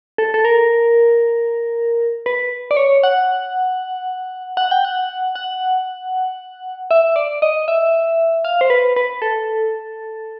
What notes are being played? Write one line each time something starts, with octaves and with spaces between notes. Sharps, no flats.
A4
A4
A#4
B4
D5
C#5
F#5
F#5
G5
F#5
F#5
E5
D5
D#5
E5
F5
C5
B4
B4
A4